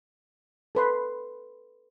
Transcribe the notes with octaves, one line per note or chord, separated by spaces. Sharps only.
A4 B4 C6